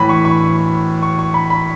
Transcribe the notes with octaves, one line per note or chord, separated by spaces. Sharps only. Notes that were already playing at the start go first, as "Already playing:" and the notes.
Already playing: A2 E3 B5
C#6
C#6
C#6
C#6
B5
B5